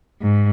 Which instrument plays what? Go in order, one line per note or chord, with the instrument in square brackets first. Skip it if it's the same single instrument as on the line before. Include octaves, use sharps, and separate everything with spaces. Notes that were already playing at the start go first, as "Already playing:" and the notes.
[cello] G#2